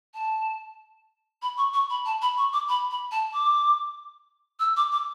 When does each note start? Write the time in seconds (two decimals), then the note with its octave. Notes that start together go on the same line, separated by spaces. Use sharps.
0.14 A5
1.42 B5
1.58 C#6
1.73 C#6
1.90 B5
2.05 A5
2.22 B5
2.37 C#6
2.53 D6
2.69 B5
2.91 B5
3.12 A5
3.33 D6
4.60 E6
4.77 D6
4.92 D6